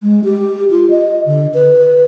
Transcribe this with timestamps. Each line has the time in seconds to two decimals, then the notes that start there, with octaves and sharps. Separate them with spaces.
0.03 G#3
0.24 G4
0.71 F4
0.90 D#5
1.26 D3
1.54 B4